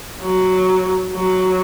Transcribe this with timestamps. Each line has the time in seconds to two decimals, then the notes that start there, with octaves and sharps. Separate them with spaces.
0.22 F#3
1.14 F#3